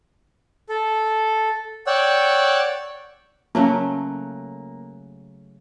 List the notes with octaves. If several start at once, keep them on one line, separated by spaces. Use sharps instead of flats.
A4
C#5 D5 F#5 G5 E6
C#3 F#3 A3 A#3